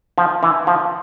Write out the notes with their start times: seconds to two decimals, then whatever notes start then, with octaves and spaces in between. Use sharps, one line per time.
0.18 F3
0.43 E3
0.67 F3